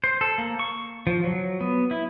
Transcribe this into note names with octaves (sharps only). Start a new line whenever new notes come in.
C5
A4
A#3
C#6
F3
F#3
B3
E4